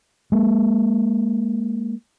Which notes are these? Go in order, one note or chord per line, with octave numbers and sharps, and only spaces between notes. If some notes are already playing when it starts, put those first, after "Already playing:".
G#3 A#3